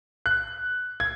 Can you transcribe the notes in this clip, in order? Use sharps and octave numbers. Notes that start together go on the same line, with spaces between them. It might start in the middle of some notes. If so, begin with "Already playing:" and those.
F#6
G#6